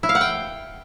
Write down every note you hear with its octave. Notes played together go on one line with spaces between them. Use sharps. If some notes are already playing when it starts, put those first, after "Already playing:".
E4
F5
F#5
G5